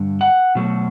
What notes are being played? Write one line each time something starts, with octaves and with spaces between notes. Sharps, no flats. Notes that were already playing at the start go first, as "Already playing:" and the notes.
Already playing: G2 D3 G3
F#5
B2 F#3 A3